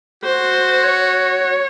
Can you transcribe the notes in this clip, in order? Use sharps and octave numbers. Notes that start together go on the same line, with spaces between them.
F#4 C5
C#5